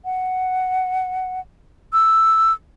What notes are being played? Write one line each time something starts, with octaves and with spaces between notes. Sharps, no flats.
F#5
E6